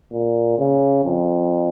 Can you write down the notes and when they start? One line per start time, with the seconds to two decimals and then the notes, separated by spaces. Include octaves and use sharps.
0.12 A#2
0.59 C#3
1.05 F2